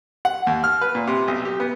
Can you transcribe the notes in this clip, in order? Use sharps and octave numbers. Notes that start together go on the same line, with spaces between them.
F#5
D#2
F6
B4
A#2
C3
B1
G4
B3